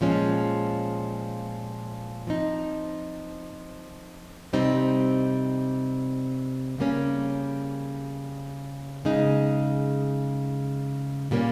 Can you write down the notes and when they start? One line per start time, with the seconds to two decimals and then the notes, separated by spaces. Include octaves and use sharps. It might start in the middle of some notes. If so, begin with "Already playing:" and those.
0.01 A#2 F3 G#3 C#4
2.27 F3 C4 D#4
4.53 C3 G3 C4 D#4
6.78 C#3 G3 A#3 C#4
9.05 C#3 G#3 D#4
11.31 A#2 G3 A#3 C#4